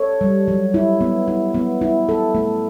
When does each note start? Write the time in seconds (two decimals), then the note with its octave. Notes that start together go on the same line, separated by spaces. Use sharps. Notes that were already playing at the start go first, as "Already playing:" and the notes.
Already playing: A4 C#5
0.21 G3
0.48 F#3
0.74 E4
1.01 B3
1.28 E4
1.54 B3
1.82 E4
2.09 A4
2.35 A3